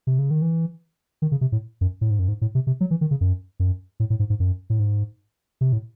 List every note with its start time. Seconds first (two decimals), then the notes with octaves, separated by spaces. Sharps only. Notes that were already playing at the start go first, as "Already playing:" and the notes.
0.07 C3
0.19 C#3
0.31 D#3
0.42 E3
1.22 D#3
1.32 C#3
1.41 C3
1.52 A2
1.81 F#2
2.01 A2
2.11 G#2
2.19 F#2
2.28 G#2
2.41 A2
2.55 C3
2.67 C3
2.81 F#3
2.91 E3
3.01 D#3
3.11 C#3
3.21 F#2
3.60 F#2
4.00 A2
4.10 A2
4.19 G#2
4.30 G#2
4.40 F#2
4.70 A2
4.79 G#2
5.61 C3
5.73 A2